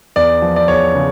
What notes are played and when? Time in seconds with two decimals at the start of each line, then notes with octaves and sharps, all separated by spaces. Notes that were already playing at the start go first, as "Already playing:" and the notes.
0.16 E2 D5
0.42 F3
0.56 D5
0.68 E2 C#5
0.95 C#3